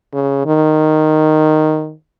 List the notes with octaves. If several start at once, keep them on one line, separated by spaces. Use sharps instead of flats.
C#3
D#3